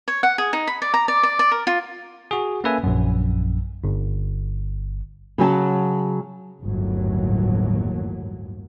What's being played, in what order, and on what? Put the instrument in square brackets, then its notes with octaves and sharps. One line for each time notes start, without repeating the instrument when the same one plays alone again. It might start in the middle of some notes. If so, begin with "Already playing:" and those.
[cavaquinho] C#5
F#5
G#4
D#4
B5
D5
A#5
D5
D5
D5
A#4
F4
[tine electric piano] F#4 G#4
A#3 C#4 A4 B4 E5 G#5
A#1 F#2
G1
[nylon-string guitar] C#3 F#3 G#5 A5
[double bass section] G1 D#2 A2 F#3